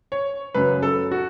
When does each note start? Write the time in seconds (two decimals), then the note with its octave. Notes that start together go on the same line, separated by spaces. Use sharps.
0.12 C#5
0.54 F#2 C#3 F#3 B4
0.82 A4
1.11 F#4